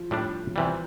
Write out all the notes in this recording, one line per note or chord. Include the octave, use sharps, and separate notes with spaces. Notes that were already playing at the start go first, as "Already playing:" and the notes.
Already playing: F3
A2 G3 D4
C3 E3 G3